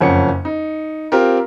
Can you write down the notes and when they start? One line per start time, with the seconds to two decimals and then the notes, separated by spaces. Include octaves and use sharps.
0.01 F#1 F2 C#4 F#5 C#7
0.45 D#4
1.12 C4 F4 G4 A#4